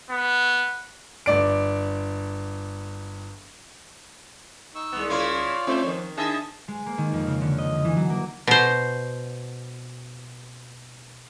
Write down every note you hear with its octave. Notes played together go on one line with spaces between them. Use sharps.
B3
G1 D5 D7
D#4 C#6 E6
C2 G#3 B3
C#3 C#4 E4 F4 C#5 D5
A3 C4 F4 C5
D#3 F3
D4 D#4 G#4 D#5 E5 A5
G#3
A#3
D#3
F2
C#3
D3
D#5
E3
F#3
A#3
B2 C5